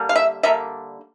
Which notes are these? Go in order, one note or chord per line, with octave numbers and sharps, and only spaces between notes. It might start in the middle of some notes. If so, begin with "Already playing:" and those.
Already playing: D3 G3 A#3
F5
E5
D3 G3 A#3 E5